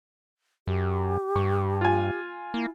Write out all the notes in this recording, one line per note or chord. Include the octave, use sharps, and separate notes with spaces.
F#2 G4
G2 C#6
F4 G#5
A#3 E4